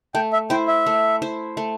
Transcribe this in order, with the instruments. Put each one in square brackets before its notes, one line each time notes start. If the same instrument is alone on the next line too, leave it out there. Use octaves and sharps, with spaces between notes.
[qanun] A3 [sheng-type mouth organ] G5
[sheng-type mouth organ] E5
[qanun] E4 C5 [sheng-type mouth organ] G5
[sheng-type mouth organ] E5
[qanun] A3
E4 C5
A3